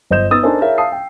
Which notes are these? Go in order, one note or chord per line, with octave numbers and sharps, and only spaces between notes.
G1 C5 D#5 G6 E7
B3 D#4 D#6 E6 A6
D4 D#4 A4 A#4 C5 G#5
E4 G#4 A#4 C#5 E5 F5
F5 A5 D#6 C7
G5